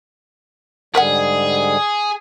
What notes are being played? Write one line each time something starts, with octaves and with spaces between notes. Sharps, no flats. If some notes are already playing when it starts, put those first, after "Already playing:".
G#2 D3 G3 G#4 A#4 E5 F#5